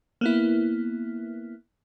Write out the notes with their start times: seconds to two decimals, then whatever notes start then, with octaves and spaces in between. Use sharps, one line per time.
0.21 A#3 B3 E4